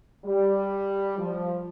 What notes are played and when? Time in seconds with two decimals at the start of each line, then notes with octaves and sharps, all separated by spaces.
0.25 G3
1.19 F3